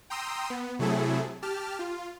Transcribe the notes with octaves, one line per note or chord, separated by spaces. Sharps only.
G5 A#5 C6 D#6 E6
B3
C3 F#3 A3 E4 G#4 A4
G4 A5 F6
F4